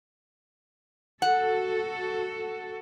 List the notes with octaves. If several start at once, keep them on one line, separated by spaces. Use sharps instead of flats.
F#4 A4 F#5